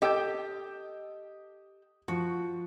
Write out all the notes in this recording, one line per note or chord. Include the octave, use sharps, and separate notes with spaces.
G4 A4 D#5 G5 G6
F3 F#4